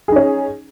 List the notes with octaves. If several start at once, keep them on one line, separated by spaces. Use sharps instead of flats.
C#4 D#4 G#4